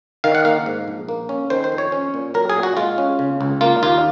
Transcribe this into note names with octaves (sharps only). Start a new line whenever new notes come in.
D#3 F5
F#5
A#3 F5
G#2
A#1
A#3
C#4
D#3 C5
C5
F2
C#5
C#4
A#2
F#3 A#4
G#4
A#2
F#4
G#3 F4
C#4
C#3
C#2
A#3 F4
D#2 F4